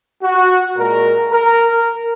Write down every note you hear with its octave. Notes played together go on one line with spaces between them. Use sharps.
F#4
A#2 G#3 A#4
A#4